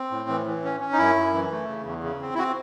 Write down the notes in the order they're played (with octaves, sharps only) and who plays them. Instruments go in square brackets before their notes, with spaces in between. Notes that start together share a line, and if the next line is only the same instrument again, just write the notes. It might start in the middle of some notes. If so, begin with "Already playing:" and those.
Already playing: [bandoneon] C4
A2
E3
E3
C#4
C#4
D#4
F#2 E4
F#2
E3
A3
C#3
E2
C#3
C4
E4
C4 F#4